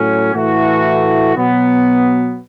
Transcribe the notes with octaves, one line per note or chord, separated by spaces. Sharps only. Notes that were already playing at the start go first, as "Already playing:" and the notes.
Already playing: A2 F#3 C#4
A2 E3 A3 F#4
B2 F#3 B3